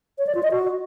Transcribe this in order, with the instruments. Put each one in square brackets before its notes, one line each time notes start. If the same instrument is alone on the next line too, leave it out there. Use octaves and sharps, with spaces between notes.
[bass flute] C#5
D5
F4
D#5
F#4